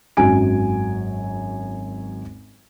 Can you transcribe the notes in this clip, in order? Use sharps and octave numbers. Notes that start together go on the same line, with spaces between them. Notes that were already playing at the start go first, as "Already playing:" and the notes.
G#1 F#2 F#3 F#4 G#5 D7